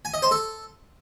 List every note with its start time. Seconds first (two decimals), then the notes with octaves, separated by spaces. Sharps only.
0.05 G#5
0.14 D#5
0.22 C5
0.31 A4